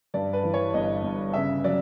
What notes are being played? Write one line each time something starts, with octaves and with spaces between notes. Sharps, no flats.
G2 D5
B4
E3
C#5
G1 D#5
G1
C#3 E5
F#3 D5